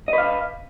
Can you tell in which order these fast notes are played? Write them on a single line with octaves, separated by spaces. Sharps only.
D#5 B4 F5